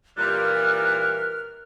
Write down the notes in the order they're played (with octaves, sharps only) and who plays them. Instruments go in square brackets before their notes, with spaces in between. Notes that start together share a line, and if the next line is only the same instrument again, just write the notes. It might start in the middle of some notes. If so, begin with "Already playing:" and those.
[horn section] A#2 E3 G3 [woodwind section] A#4 F6 [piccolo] F#6